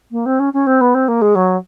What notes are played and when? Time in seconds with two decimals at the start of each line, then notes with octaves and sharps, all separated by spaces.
0.11 A#3
0.26 C4
0.39 C#4
0.53 C#4
0.67 C4
0.81 B3
0.94 C4
1.08 A#3
1.22 G#3
1.35 F#3